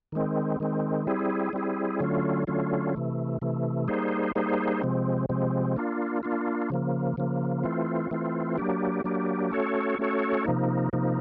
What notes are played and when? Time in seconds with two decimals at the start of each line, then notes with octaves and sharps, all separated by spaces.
0.12 D#3 G#3 C4
0.60 D#3 G#3 C4
1.07 G3 C4 E4 G#4
1.53 G3 C4 E4 G#4
2.00 D3 F#3 A3 C#4 F4
2.47 D3 F#3 A3 C#4 F4
2.94 C3 E3 A3
3.42 C3 E3 A3
3.88 G3 A#3 D#4 G#4 C5
4.35 G3 A#3 D#4 G#4 C5
4.82 C3 F3 G#3 C4
5.29 C3 F3 G#3 C4
5.77 A#3 D4 F4
6.23 A#3 D4 F4
6.70 C#3 F3 A#3
7.17 C#3 F3 A#3
7.64 E3 A3 C4 F4
8.11 E3 A3 C4 F4
8.58 F#3 A#3 D4 G4
9.04 F#3 A#3 D4 G4
9.51 A3 C#4 F#4 A4 C#5
9.99 A3 C#4 F#4 A4 C#5
10.45 C3 F3 A#3 D#4
10.93 C3 F3 A#3 D#4